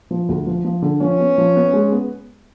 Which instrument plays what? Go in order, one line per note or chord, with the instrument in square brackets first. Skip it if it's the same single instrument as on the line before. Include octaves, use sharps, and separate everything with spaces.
[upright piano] F3
D2
F3
F3
D3
[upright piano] F3 [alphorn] C#4
[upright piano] B3
F3
B3
G#3
B3